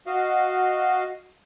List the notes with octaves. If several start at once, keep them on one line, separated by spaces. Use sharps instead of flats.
F#4 D#5 F5